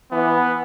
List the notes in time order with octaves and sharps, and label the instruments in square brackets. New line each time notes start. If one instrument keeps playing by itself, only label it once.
[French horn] E3 [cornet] B3